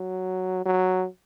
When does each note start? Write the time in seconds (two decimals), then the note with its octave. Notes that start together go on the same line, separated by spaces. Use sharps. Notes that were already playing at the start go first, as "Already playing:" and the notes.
Already playing: F#3
0.66 F#3